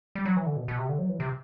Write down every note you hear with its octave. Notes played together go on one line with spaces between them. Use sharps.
G3
F#3
E3
D3
B2
B2
C3
D3
F#3
E3
C3